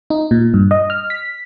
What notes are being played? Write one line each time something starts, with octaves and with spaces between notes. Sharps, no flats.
D#4
A#2
G2
D#5
F6
B6